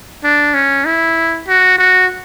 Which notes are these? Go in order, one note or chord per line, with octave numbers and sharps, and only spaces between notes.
D4
C#4
E4
F#4
F#4